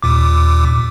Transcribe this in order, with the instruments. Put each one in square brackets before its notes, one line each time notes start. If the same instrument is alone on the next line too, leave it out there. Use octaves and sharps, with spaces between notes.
[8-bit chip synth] D#2 A#2 D6